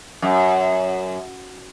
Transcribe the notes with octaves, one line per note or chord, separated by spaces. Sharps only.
F#2